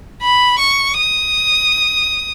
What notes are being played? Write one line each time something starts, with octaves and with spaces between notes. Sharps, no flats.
B5
C#6
D#6